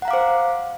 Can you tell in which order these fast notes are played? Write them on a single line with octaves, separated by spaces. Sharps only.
F#5 A#5 F5 D6 C5